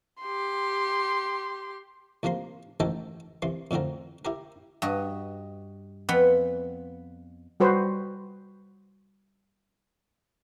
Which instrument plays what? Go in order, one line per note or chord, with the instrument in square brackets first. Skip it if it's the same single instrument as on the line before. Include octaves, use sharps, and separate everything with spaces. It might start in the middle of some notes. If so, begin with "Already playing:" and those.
[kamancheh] G4 C6
[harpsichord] C2 F3 A#3 A#4 C6
A1 G#2 D#3 A4 A#4 G5
C2 E3 C6
F2 A2 D3 C4 A#4
E4 G4 A#4
[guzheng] G2 F#4 D#5
F2 B3 F4 F#5 B5
[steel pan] G3 F#4 B4 C5